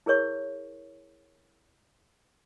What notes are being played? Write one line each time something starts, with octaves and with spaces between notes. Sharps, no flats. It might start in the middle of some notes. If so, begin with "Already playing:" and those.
E4 G#4 A#4 C#5 C#6